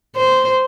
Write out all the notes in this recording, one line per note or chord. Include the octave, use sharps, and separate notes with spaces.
C5